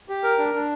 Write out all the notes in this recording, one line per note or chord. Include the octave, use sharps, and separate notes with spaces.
G4
A#4
D4
D4